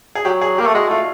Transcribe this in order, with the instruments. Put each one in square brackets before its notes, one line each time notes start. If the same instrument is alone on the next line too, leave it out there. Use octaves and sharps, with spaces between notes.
[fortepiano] G#4
[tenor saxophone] F#3 [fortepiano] G4
[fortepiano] G#4
[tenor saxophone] A#3 [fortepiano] G4
[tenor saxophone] A3
[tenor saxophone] G#3 [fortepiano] F#4
[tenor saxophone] A3 [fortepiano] F4